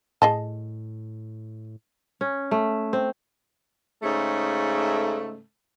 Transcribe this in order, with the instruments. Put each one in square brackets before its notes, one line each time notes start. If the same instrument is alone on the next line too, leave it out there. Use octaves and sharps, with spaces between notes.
[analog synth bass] A2 [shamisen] G#4 D#5 A5
[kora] C#4
A3
C4
[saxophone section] G#2 C#3 A3